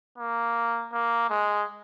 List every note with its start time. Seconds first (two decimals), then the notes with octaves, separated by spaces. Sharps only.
0.18 A#3
0.93 A#3
1.30 G#3